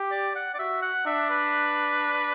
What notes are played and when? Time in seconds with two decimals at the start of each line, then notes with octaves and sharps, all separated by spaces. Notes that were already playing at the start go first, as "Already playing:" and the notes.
Already playing: G4
0.11 D5
0.36 F#5
0.54 D5
0.59 F#4 E5
0.83 F#5
1.06 D4 E5
1.30 B4